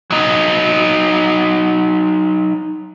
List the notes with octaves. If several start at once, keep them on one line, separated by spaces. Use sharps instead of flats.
F#3 D#4